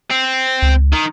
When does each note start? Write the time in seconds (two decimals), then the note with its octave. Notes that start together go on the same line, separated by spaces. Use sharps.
0.11 C4
0.62 C#2
0.93 D#3